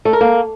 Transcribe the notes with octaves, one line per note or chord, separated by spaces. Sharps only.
A3
A#4
A#3